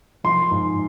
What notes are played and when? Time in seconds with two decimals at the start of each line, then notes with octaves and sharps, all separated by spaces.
0.24 F3 C6
0.51 G#2